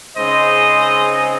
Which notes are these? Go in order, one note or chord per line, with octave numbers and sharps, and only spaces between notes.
C#3 G#3 C4 D#4 C5 D#5